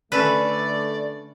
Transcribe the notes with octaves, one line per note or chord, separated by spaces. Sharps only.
D3 A3 C#4 A4 B4 D5